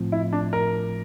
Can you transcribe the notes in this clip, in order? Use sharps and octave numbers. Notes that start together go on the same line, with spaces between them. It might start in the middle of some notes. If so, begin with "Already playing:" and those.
Already playing: A2 F3 C4
E4
D4
A#4